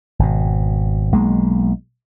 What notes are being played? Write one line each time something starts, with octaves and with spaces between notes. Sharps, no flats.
G#1 B2
B1 F#3 G#3 A#3